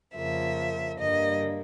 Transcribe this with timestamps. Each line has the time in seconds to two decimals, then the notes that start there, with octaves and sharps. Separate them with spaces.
0.15 F2 C#3 F3 A#3 E5
0.99 G2 D3 G3 A#3 D#5